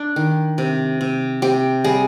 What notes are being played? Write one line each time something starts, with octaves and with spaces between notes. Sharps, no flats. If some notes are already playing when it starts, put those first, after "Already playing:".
Already playing: D4
D#3
C3
C3
C3 G4
G3 G#4